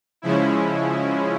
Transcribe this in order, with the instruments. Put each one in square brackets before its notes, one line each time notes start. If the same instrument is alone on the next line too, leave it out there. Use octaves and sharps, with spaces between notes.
[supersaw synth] C#3 F3 G#3 C#4 E4